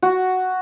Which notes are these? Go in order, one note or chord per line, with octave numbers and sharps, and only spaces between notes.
F#4